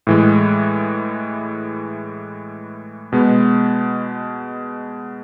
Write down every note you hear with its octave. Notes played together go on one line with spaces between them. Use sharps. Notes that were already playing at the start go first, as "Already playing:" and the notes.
A2 E3 G#3
B2 G#3 B3